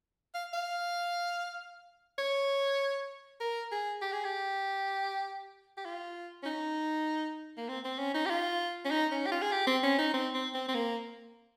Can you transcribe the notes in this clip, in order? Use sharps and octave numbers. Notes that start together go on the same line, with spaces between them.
F5
F5
C#5
A#4
G#4
G4
G#4
G4
G4
F4
C#4
D#4
A#3
C4
C4
C#4
D#4
G4
F4
C#4
D#4
C#4
G4
F4
G#4
G4
C4
C#4
D#4
C4
C4
C4
C4
A#3